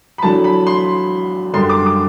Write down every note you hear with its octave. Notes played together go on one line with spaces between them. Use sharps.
B5
E2 D3 F#3 A5
B5
C6
F#2 D3 G3 D4 C6
D6
D6